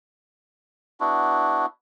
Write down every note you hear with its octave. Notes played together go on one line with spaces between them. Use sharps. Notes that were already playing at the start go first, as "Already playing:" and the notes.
B3 D4 E4 F#4